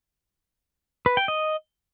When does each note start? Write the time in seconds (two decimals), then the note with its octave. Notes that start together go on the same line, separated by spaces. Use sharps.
1.06 B4
1.17 G5
1.28 D#5